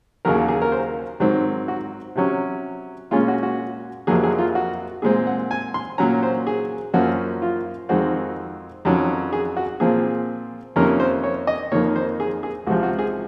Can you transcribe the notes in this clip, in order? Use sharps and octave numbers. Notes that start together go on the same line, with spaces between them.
D#2 C#3 F#3 A#4
G#4
A#4
C5
G#2 D#3 F#3 C4
F#4
C3 F#3 C#4
A#2 G#3 C#4 F4
F#4
F#4
F2 C3 F#3 A#3 G#4
G#4
F4
F#4
A#2 G#3 C4 G#4
F#5
G#5
C6
A#2 F#3 C#4 A#5
C5
G#4
F#2 F3 A#3 C#4 F#4
F4
F2 D#3 G#3 C4 F#4
F2 D#3 F#3 C#4
G#4
F#4
A#2 F3 C4 G#4
F2 C3 D#3 A#3 C#4 A#4
C5
C#5
D#5
F2 D#3 A#3 C#5
C5
G#4
G#4
C#2 C3 F3 F#4
F#4
G#4